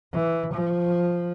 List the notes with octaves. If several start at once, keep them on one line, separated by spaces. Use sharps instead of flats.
E3
F3